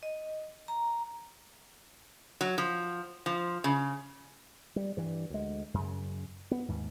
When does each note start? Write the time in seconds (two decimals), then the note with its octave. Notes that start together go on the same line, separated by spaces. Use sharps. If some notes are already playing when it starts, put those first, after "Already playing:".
0.03 D#5
0.68 A#5
2.41 F#3
2.58 F3
3.26 F3
3.64 C#3
4.76 G3
4.97 G2 E3
5.30 D2 G#3
5.74 F#2 C#3
6.51 B3
6.68 D#2 G#2